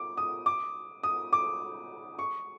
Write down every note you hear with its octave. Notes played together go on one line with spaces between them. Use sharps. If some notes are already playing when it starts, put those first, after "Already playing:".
Already playing: D6
D#6
D6
D#6
D6
C#6